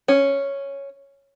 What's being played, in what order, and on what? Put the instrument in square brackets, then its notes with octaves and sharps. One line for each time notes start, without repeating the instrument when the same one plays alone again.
[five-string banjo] C#4